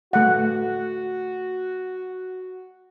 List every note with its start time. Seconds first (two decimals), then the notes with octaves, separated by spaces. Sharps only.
0.13 A3 F#4 F#5